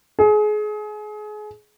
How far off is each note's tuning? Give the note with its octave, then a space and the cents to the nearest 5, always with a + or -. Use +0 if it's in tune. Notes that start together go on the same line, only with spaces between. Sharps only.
G#4 +30